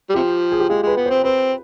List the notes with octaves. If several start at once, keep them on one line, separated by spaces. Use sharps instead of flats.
G3
C3 F3 G4
G#4
G4
G#3 F4
G#3 B4
B3
C4 C5
C4 B4